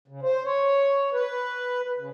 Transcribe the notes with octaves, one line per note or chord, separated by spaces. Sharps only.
C#3
C5
C#5
B4
C#3